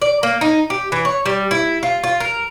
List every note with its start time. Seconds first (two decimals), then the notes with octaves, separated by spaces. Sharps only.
0.02 D5
0.23 A#3
0.41 D#4
0.70 G4
0.92 E3
1.05 C#5
1.26 G3
1.51 E4
1.83 F4
2.04 F4
2.20 A#4